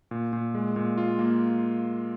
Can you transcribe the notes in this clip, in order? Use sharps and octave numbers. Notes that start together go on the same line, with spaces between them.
A#2
A#2
G#3
A#2
F4
A#3